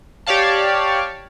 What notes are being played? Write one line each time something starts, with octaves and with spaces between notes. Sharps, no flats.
G4 C#5 D5 F5 A5